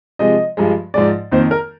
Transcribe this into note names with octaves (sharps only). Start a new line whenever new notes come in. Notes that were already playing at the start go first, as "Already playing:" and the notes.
C3 F3 G#3 D#5
G2 F3 G#3
G#2 F3 G#3 D5
F2 D#3 A#3 C5
A#4